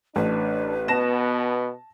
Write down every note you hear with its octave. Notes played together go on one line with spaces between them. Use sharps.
A1 D4 B4
B2 B3 A5 A#6 E7